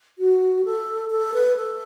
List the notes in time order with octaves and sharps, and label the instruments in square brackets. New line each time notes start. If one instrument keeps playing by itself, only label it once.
[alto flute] F#4
A4
A4
B4
A4